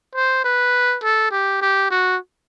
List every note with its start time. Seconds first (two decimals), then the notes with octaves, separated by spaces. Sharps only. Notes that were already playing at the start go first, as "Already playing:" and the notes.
0.15 C5
0.45 B4
1.03 A4
1.31 G4
1.62 G4
1.91 F#4